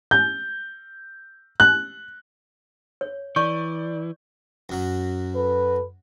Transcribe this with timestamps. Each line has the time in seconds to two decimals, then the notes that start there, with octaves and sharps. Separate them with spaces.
0.11 G6
1.60 F#6
3.01 C#5
3.36 E3 D5 C#6 G6
4.69 F#2 F#3
5.34 A4 B4